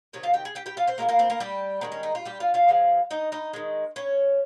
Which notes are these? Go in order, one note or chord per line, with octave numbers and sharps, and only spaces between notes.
C3 D#3 C#5
F4 F5
G4 G5
G#4 G#5
G4 G5
G4 G5
F4 F5
C4 C5
A#2 F3 G#3 A#3 A#4
A#3 A#4
C4 C5
A#3 A#4
G3 G4
D#3 G#3 C4
C#4
D#4
F4
G3 G4
F4 F5
F4 F5
C#3 F3 G#3
D#4 D#5
D#4 D#5
D#3 G#3
C#4 C#5